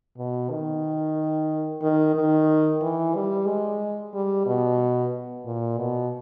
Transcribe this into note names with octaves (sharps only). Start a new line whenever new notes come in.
B2
D#3
D#3
D#3
E3
G3
G#3
G3
B2
A#2
B2